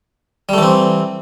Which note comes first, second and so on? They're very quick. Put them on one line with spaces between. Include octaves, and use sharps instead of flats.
G3 A3 E3 C4